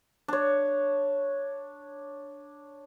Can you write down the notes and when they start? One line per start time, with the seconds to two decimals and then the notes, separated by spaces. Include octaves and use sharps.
0.28 D4 C#5